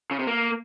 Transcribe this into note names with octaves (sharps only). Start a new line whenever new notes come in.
C#3
C3
A#3